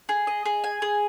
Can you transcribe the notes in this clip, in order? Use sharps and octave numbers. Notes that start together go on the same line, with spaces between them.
G#4
D#5
G#4
G#5
G#4